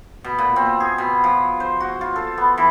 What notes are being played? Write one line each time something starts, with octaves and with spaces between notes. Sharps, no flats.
B2
A#2
C4
G#4
B2
F3
C5
F#4
F4
A4
B3
E3